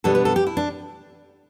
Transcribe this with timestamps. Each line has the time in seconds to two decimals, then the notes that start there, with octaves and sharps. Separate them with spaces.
0.04 B2 G3 B3 D4 A4
0.15 B4
0.25 A4
0.36 G4
0.47 E4
0.57 D4